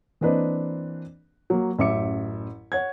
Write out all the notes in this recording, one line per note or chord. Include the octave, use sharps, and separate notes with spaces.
E3 A#3 C4 D4 B4 D#5
F#3 A#3
A1 F#2 E5 D6 C#7
C#5 F#5 G#6